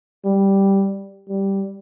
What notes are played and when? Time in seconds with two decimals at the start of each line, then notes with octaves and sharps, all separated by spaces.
0.25 G3
1.29 G3